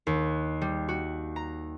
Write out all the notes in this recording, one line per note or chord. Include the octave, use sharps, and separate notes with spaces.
D#2
G3
F#4
A#5